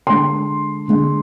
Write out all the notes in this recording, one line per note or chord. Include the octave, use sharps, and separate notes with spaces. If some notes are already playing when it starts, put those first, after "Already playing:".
D3 G#3 C6
D3 G#3